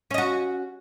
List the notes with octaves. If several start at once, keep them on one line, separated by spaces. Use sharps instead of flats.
C#4 F#4 D#5